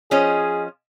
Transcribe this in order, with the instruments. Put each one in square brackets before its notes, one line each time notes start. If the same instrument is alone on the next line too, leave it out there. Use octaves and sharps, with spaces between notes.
[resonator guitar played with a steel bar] F3 C#4 D#5 [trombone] G#4